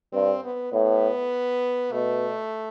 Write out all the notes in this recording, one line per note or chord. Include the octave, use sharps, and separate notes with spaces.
G2 C4
B3
A2 B3
B2 A3